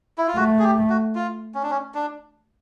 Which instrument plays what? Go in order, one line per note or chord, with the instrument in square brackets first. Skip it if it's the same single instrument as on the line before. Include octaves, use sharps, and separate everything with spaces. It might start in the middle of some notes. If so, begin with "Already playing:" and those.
[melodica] E4
F4
[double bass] A3 [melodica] F#4
[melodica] G#4
G4
F#4
F4
C#4
D4
C#4
D4